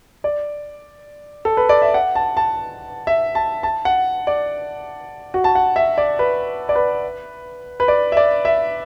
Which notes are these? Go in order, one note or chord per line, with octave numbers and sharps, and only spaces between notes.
D5
A4
B4
D5
E5
F#5
A5
A5
E5
A5
A5
F#5
D5
F#4
A5
F#5
E5
D5
B4
D5
B4
B4
D5
E5
D5
E5